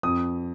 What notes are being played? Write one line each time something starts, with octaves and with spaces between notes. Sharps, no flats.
F2 D#6